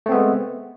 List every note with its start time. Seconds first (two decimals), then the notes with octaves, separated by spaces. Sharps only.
0.06 A3
0.09 C4
0.12 B3
0.15 G#3